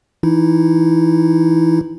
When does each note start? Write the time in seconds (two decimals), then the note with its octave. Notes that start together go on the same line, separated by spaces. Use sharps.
0.23 E3 D#4 E4